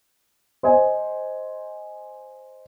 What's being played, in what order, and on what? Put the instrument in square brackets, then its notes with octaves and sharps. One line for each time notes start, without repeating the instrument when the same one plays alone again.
[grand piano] C5 D#5 G#5